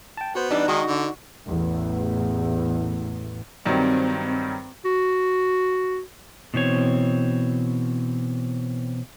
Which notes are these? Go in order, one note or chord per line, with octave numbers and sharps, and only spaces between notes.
G5 A5
B3 F#4 C5
E3 G3 D4 D#4
D#3 G#3 F#4
D3
A1 E2 A2
G2 D#3 F#3 C4
F#4
B2 E3 C4 C#5